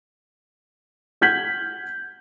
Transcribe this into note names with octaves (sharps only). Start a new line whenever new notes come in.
F#5 F6 G6 G#6 B6 F#7